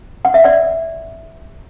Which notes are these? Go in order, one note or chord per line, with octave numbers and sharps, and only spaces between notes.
F#5
E5
D5 F#5